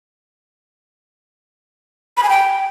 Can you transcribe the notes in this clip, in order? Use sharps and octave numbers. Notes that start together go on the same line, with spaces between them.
B5
G#5
G5